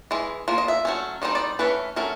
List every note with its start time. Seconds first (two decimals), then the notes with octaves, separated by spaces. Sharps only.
0.11 E3 G#3
0.48 F3 A#3
0.58 D#5
0.68 E5
0.85 F#3 A3 C#4
1.22 D#3 G3 C4 D#4 D#5
1.35 D5
1.59 E3 A3 C#4 B4
1.96 F#3 A3 C#4 A#4